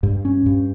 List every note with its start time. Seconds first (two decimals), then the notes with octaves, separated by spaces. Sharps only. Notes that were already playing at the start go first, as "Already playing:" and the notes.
0.03 G2
0.25 C#4
0.46 G2